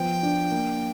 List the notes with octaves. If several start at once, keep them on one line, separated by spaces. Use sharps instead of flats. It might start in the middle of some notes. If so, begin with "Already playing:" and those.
Already playing: F3 B3 G5
D4
A#3